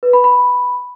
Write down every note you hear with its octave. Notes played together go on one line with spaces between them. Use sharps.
B4
B5
B5